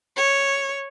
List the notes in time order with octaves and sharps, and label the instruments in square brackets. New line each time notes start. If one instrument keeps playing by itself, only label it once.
[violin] C#5